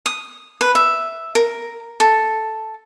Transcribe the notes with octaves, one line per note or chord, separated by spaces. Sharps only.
D#6
B4
E5
A#4
A4